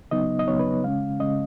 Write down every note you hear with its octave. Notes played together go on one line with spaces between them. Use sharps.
C#3 F#3 B3 D#4 D#5
D#5
C#3 F#3 B3 D#4 C#5
B4
C#3 G#3 C#4 F5
C#3 G#3 C#4 D#5